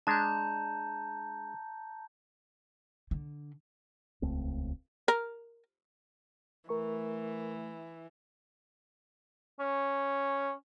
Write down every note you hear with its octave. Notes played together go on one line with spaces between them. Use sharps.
G#3 D4 A5 A#5 G6
D3
D#1 C#2 A3 C4
A#4
E3 A3 A#4 C#6
C#4